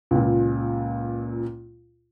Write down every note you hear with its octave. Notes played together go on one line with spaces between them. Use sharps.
C#2 A#2